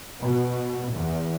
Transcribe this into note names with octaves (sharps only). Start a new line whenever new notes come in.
B2
E2